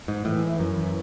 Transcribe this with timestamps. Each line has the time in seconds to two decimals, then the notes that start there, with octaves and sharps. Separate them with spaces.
0.08 G#2
0.25 A2 E3
0.59 F#2
0.76 E3